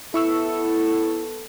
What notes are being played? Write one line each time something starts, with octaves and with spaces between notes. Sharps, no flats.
B3 E4 A4 C#6 E6